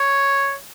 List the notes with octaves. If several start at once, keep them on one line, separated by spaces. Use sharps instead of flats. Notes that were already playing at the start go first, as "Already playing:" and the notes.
Already playing: C#5